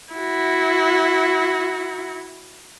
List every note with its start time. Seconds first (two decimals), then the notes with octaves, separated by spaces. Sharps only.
0.13 E4 F#4